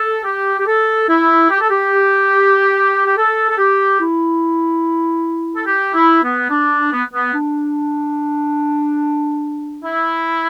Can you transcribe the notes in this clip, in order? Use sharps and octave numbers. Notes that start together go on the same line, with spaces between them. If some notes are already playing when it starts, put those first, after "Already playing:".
Already playing: A4
G4
G4
A4
E4
G4
A4
G4
G4
A4
A4
G4
E4
A4
G4
E4
B3
D4
B3
B3
D4
E4